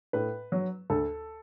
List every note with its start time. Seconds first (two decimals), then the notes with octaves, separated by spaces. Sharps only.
0.13 A2 B4
0.52 F#3
0.90 D2 A4